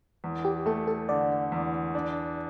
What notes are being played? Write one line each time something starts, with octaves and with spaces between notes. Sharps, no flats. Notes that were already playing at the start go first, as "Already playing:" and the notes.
E2
G4
A3 A4
A4
D3 D5
E2
D4